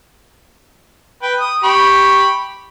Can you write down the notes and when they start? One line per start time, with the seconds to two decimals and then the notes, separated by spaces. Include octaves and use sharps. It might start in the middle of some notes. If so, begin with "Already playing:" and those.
1.23 B4 G5
1.40 D#6
1.64 G4 B5 C#6